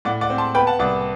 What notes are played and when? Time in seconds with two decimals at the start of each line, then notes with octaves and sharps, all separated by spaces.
0.05 A2 D5 F#5
0.21 D5 F#5
0.30 C4
0.38 A5 C6
0.55 B3 G5 B5
0.67 F#5 A5
0.79 C2 D5 F#5